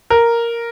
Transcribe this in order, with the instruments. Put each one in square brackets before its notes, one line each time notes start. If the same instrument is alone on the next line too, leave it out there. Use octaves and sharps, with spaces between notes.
[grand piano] A#4